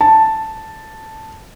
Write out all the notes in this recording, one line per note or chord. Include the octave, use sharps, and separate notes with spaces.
A5